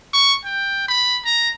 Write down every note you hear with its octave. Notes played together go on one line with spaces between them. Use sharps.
C#6
G5
B5
A#5